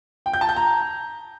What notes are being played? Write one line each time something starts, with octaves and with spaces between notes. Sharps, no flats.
G5
G6
A5
G6
A#5